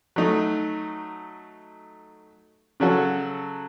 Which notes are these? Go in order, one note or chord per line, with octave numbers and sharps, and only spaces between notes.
F#3 A3 D#4
C#3 F#3 C#4 F#4 A4